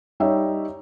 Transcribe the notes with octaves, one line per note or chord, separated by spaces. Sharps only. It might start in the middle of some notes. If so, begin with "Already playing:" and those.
G3 D#4 G4 C#5 E5